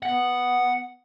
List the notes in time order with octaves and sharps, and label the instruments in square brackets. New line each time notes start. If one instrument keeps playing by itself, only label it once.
[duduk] B3 [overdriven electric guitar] F#5